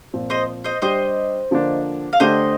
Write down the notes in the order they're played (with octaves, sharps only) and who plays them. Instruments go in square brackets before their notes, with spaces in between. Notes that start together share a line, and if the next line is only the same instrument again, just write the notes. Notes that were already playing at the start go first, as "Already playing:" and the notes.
[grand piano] A#2 F3 C4
[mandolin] C5 D#5
C5 D#5
[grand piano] G3 D4 G4 [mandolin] C5 D#5
[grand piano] D3 F3 A#3 D4
[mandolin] F5
[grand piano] D3 A3 D4 G4 [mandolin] C5 D#5